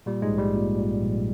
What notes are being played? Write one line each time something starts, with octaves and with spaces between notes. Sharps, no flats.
A#2 G3
G#2 G#3
A#1
G3
A#2
A#2
A#1